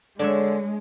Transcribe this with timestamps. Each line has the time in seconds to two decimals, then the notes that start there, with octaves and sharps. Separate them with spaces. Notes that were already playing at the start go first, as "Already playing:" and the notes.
0.19 D3 G#3 D4 C#5 E5